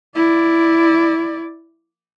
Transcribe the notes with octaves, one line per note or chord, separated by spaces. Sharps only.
E4 D5